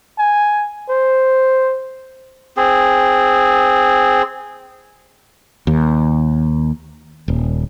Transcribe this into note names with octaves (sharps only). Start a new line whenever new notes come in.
G#5
C5
C4 G#4
D#2
D#1